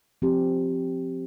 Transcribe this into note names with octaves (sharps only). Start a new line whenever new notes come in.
F3 C4 G4